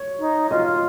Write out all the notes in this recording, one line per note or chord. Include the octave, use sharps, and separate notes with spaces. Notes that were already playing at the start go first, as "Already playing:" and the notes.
Already playing: C#5
D#4
F4 D#5